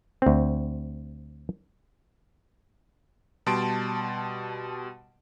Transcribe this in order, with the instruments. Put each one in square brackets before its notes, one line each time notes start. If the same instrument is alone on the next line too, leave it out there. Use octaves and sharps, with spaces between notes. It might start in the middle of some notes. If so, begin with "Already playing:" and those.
[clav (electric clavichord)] D2 C4
[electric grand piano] B2 G3 A5 C6 D7